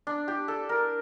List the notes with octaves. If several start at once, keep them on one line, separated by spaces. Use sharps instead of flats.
D4
G4
A4
A#4